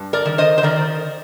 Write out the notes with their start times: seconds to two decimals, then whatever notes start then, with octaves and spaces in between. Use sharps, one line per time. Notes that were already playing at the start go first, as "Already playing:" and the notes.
Already playing: G2
0.13 A#4 D5
0.25 D#3
0.38 C5 D#5
0.58 C5
0.63 D#3 A#4 D5